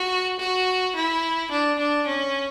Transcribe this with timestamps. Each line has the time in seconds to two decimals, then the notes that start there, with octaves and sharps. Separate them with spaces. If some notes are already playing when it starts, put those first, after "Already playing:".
Already playing: F#4
0.39 F#4
0.95 E4
1.51 D4
1.78 D4
2.07 C#4